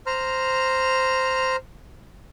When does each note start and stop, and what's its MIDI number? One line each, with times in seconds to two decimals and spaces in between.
0.06 1.56 72
0.06 1.56 82
0.06 1.56 89